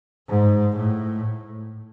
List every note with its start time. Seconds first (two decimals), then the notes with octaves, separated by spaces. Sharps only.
0.28 G#2
0.77 A2